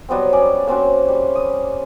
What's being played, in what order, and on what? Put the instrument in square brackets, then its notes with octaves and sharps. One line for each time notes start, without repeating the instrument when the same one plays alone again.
[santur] F#3 G3 B3 C4
G3 C#4 D5
A#3 C4 C#4 F#4
G3
D#6